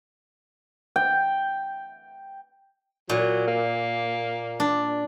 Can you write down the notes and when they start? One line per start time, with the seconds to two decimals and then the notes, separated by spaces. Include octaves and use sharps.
0.96 G5
3.09 A#2 F#3
3.48 A#3
4.60 D4